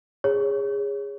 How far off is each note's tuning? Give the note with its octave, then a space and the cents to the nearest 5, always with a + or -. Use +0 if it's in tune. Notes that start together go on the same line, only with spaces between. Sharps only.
G#4 -25 C#5 +0